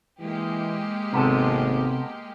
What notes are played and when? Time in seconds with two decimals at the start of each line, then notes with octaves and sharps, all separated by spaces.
0.20 E3 G#3 A#3 G4
1.13 G#1 C3 B3 A4